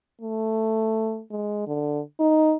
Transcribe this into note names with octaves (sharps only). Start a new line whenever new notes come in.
A3
G#3
D3
D#4